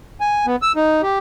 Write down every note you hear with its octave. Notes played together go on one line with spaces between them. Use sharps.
G#5
B3
E6
D#4
G4